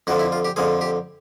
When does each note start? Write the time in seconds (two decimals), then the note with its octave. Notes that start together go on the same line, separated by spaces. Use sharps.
0.07 F2 D3 F3 F#4
0.19 E4
0.32 F4
0.45 G4
0.56 F2 D3 F3 G#4
0.81 G4